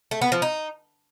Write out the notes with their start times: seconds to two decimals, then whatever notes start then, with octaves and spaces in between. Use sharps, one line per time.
0.11 A3
0.22 B3
0.32 F3
0.42 D#4